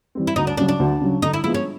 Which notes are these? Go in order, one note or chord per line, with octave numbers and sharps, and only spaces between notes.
E3 G3 C4
E4
D2 D#4
D4
C#3 F#3 D4
D4
D2
C#3 F#3
D3 D#4
E4
F3 G#3 B3 E4
C#4